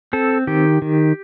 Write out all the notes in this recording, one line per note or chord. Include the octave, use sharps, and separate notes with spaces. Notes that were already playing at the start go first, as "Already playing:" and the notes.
C4 A4
D#3 G4
D#3